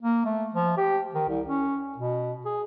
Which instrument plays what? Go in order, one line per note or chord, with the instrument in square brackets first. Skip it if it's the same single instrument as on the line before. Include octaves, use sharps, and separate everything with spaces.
[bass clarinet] A#3
A3
F3
G4
D#3
C2
C#4
B2
G#4